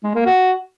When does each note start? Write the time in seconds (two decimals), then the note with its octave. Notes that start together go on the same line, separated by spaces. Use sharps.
0.04 G#3
0.15 A#3
0.26 F#4